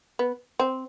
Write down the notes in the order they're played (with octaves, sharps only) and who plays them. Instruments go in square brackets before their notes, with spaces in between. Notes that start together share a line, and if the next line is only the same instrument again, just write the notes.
[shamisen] B3
C4